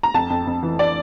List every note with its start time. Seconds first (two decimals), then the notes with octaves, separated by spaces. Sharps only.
0.03 A#5
0.14 F2 A5
0.30 F2
0.47 F2
0.63 E3
0.79 D5